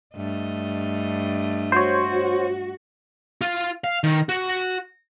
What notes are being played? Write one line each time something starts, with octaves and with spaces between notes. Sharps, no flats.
G2 A3 D#5
F#4 C5 C#5
F4
F5
D#3
F#4